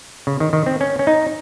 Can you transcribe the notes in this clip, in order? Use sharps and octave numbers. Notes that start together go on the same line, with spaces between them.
C#3
D#3
D#3
C4
C#4
C#4
D#4